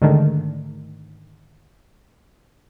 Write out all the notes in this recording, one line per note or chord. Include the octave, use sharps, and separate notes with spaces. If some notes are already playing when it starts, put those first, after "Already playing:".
G#2 D3 D#3 A3